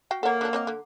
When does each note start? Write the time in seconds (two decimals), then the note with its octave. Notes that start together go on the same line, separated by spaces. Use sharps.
0.11 F#4 F5 G5
0.23 A#3 A4 C#5 F#5 A#5
0.41 D3 F#3 D4
0.53 C4 C#5 D#5 D6
0.67 D3